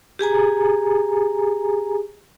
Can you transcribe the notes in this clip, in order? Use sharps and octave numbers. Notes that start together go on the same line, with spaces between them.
G4 G#4 G#5 A#5